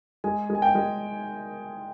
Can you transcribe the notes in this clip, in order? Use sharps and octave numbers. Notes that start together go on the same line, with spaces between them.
G#3 G#5
G#3
G#5
G5
G#3